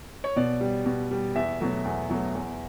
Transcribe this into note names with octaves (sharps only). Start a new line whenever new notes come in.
C#5
B2 D5
G3
B2
G3
E2 E5
B2 F#3 A3
E2
B2 F#3 A3
E2